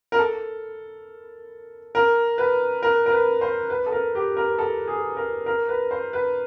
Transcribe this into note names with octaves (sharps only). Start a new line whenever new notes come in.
A#4
A4
A#4
B4
A#4
A#4
B4
C5
B4
A4
A#4
G4
A#4
A4
G#4
A#4
A#4
B4
C5
B4